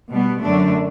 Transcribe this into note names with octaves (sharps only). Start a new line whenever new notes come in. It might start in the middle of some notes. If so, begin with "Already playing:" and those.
B2 G3 B3
F#2 D3 A3 D4